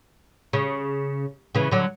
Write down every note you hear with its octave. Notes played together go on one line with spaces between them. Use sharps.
C#3
C#3 E3
D3 F#3